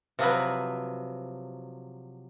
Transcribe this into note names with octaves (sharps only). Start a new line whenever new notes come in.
C3 F3 F#3 B4